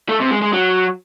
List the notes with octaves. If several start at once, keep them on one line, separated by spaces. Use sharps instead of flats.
A3
C3
G#3
G#3
F#3